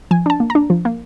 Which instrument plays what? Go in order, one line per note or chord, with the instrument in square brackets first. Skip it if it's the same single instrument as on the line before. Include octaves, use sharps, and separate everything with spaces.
[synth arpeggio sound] F3 G#5
D4 A5
A#3
A#5
D4
F3
A#3